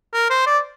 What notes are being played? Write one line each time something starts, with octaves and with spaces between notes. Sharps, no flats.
A#4
C5
D5